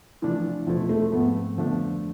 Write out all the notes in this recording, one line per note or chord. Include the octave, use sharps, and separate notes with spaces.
C3 E3 F3 A3 D4 F4
E2 B2 F3 A3 E4
A3
G#2 F3 A3 B3 C4
F2 D3 F3 A3 B3 D4